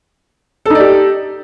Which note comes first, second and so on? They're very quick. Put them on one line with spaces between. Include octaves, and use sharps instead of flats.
A4 D#4 D5 G4